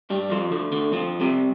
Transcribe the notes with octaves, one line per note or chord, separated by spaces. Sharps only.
G2 G3
F2 F3
D2 D3
D2 D3
F2 F3
C2 C3